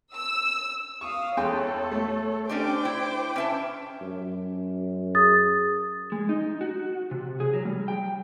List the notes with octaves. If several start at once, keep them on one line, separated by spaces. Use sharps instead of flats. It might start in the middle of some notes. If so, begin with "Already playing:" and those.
E6
F5 C#6 D#6
E2 A4 C#5 G5 C6
A3
C#4 D4 G4 C5 G5 D6
E4
C#4 E5 A5
F#2
G#4 D#6 A6
G#3
D#4
F#4
C3
G#4
F#3
G3
G5